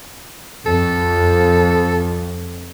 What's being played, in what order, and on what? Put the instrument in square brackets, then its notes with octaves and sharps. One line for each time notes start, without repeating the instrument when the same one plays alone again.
[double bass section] F2 [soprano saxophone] A4